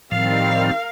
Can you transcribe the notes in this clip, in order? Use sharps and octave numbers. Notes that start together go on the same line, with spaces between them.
A2 D#3 F3 G3 C4 A#4 F5